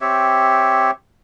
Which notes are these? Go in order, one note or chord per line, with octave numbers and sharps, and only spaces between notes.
C4 G4 C#5 E5